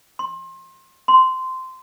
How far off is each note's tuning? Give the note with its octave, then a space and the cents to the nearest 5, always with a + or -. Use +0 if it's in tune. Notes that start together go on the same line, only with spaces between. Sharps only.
C6 +30
C6 -15